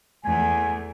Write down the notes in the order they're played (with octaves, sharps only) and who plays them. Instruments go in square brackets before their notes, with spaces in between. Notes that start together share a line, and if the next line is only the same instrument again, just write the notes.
[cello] E2 A3 [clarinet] G#5